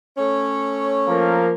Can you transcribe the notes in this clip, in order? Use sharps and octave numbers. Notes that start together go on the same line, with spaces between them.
A3 C#4 C#5
F3 A#3 A#4